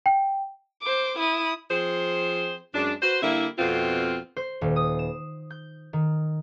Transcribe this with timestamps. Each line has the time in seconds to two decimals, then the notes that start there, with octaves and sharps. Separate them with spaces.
0.06 G5
0.82 C5 D6
1.18 E4 D#6
1.70 F3 C4 G#4 C5
2.74 F#2 G#3 D4
3.02 F#4 B4 C5
3.22 D3 G3 A#3 E4
3.58 F2 B2 C4 F4
4.37 C5
4.61 D#1
4.76 D#6
4.99 E7
5.50 G6
5.93 D#3